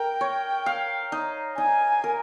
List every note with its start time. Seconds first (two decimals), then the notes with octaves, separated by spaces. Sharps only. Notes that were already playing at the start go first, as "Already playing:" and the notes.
Already playing: A#4 G5
0.21 C#5
0.66 F5
1.12 D#4
1.57 D#4 G#5
2.04 A#4